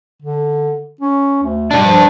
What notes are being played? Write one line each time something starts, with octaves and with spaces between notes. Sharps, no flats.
D3
C#4
D2
G2 B2 D4
F3